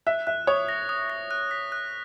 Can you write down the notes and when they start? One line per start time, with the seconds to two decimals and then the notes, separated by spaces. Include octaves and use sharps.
0.07 E5 F#6
0.27 E5 F#6
0.47 C#5 D#6
0.69 A#6
0.89 D#6
1.10 A#6
1.31 F#6
1.51 B6
1.72 F#6